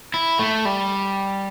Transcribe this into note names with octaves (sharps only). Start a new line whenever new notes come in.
E4
A3
G3